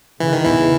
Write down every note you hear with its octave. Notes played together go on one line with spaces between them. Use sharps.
C#3 E3
D#3
E2 E3